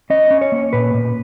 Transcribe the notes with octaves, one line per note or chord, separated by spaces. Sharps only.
C#4 D#5
C#4
C#5
A#3
A#2 B4
A#2